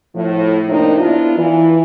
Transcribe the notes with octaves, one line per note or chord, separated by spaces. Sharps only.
A2 F3
F2 A2 C3 A#3 D4 D#4
B3 D4 E4 F4
E3